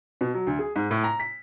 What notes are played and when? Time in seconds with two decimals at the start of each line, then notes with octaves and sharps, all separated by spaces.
0.21 B2
0.34 F#3
0.47 D2
0.59 G#4
0.76 G#2
0.91 A2
1.04 A#5
1.20 B6